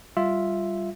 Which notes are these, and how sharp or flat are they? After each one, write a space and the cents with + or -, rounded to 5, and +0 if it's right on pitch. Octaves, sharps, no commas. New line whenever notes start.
G3 +0 F4 +0 E5 +0